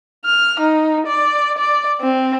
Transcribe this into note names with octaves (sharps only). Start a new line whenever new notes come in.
F6
D#4
D5
D5
C4